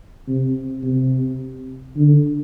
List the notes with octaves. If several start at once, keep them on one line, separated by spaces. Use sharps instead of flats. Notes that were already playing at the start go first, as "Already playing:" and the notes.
C3
C3
D3